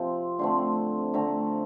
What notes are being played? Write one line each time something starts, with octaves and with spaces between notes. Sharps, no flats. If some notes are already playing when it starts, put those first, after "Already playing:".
Already playing: C3 F3 C4
D3 A3 C4 C6
D3 A3 C4 A#5